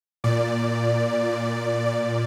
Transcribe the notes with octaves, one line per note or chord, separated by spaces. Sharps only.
A#2 D5
A#2
D5